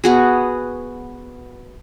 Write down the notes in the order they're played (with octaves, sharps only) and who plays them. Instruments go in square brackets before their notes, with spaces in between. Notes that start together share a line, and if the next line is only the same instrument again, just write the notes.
[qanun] B3 F#4 G#4